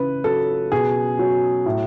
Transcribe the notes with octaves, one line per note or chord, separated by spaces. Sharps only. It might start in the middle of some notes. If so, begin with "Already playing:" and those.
Already playing: C#3 E3 B4
F#3 A4
B2 G#4
F#3
A2